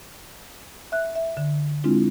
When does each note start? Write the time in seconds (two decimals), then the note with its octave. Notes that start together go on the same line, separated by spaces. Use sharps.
0.92 E5 F#6
1.15 E5
1.37 D3
1.84 G#3 C4 D4 E4 F4